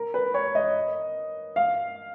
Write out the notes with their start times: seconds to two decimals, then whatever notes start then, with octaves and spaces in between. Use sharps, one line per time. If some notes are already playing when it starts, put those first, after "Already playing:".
Already playing: A#4
0.14 B4
0.34 C#5
0.55 D#5
1.56 F5